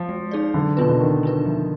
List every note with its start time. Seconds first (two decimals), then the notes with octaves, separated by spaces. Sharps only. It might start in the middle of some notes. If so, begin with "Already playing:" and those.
Already playing: F3
0.09 G#3
0.31 D#4 G#4 D5
0.54 D3 F#3
0.77 B2 D4 F4 B4
0.89 D3
1.00 D#3 F#3
1.23 D4 F4 B4
1.46 F3